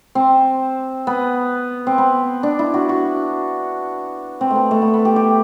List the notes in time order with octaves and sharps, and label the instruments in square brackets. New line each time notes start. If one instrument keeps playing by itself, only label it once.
[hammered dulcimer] C4
B3
C4
B3
D4
E4
F#4
F#4
C4
A3
B3
A3
B3
B3
G4
G4